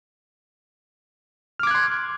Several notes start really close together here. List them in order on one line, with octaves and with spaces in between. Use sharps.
F6 D6 G#6 F#6 C6